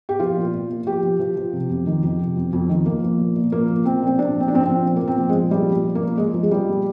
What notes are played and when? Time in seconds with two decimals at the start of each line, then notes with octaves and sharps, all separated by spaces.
0.09 G4
0.20 F3 F4
0.37 A#2
0.54 A#2
0.70 A#2
0.86 F3 G4
1.03 F3
1.19 F3
1.36 F3
1.53 C3
1.69 F2
1.86 D#3
2.03 F2
2.19 C3
2.36 F2
2.53 F2
2.69 D#3
2.86 F3 A#3
3.02 F3
3.19 A#2
3.36 A#2
3.52 F3 A#3
3.69 F3
3.85 F3 C4
4.02 A#2 C4
4.18 A#2 D4
4.35 F3
4.40 C4
4.48 D4
4.52 F3 C4
4.63 F3 C4
4.85 A#2
4.96 A#3
5.02 F3
5.08 C4
5.18 F3
5.29 G#3
5.35 A#2
5.51 F3 G3
5.68 A#2
5.85 F3
5.95 A#3
6.01 A#2
6.18 F3 G#3
6.34 F3
6.43 G#3
6.51 F3 G3
6.68 A#2